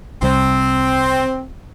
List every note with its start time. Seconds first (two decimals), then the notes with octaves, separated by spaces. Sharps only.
0.22 C2 C3 G3 C4